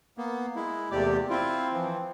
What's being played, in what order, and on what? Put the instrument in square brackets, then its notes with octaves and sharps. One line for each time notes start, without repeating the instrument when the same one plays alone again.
[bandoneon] A#3 B3
G#3 E4
[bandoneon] E2 C3 G4 [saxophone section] A3 A#3 D5
[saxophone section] C4 [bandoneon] E4 F4
[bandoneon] E3 F3